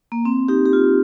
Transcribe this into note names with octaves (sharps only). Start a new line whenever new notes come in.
A#3
C4
D#4 G4
G4
F4